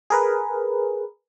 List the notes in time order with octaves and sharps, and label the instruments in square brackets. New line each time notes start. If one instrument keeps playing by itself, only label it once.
[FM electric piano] G#4 A#4 B4